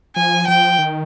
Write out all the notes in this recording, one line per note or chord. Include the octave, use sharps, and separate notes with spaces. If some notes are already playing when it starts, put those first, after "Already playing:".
F3 G#5
F3 G5
D#3